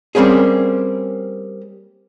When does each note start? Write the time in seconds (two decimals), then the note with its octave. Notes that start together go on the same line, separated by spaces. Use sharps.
0.15 G3 A#3 C4 C#4 G#4